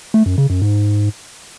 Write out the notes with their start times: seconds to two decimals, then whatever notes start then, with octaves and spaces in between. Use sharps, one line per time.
0.14 A3
0.26 F#2
0.38 C#3
0.50 F#2
0.62 G#2